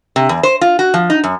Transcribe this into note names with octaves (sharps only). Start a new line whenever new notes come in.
C3
E2
C5
F4
F#4
F3
D#4
F#2